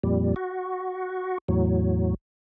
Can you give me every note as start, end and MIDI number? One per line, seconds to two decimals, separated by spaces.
0.04 0.34 41
0.04 0.34 46
0.04 0.34 55
0.36 1.38 66
1.48 2.14 40
1.48 2.14 45
1.48 2.14 54